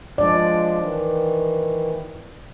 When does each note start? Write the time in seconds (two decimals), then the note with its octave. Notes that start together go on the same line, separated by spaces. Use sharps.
0.18 F3 G#3 D4 D5
0.81 D#3 E3